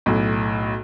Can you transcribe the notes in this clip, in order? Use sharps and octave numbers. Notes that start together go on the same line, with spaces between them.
B1 A2